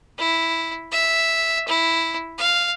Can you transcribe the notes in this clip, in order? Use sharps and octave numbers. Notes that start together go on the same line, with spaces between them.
E4
E5
E4
F5